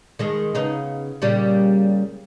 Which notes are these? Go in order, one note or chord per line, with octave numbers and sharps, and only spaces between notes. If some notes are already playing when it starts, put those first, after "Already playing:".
D#3 G#3 G#4
C#3 B3 D#4
A#2 C#3 G3